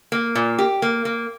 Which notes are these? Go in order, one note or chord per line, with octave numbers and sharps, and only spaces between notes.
A#3
A#2
G4
A#3
A#3